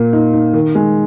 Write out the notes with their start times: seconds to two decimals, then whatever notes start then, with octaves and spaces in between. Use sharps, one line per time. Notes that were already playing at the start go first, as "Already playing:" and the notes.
Already playing: A#2 A#3
0.13 D#4
0.33 D#4
0.53 D#3
0.75 G#3